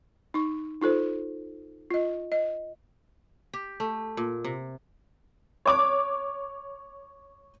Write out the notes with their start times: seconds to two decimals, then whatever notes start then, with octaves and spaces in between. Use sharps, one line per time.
0.34 D#4 C#6
0.81 D#4 F4 A4 C5
1.91 F4 D#5
2.32 D#5
3.53 G4
3.80 A3
4.17 A#2
4.44 C3
5.65 C#5 D6